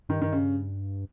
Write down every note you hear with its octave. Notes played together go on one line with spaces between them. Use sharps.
G2 D#3
D#3
C#3